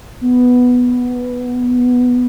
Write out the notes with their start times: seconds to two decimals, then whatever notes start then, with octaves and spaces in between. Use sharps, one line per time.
0.21 B3